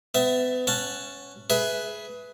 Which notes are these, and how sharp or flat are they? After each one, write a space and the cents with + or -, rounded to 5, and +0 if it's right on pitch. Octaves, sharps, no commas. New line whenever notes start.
B3 +35 E5 +0
C#4 +0 F#5 +0 A5 +0
G#4 +20 B4 +0 E5 +0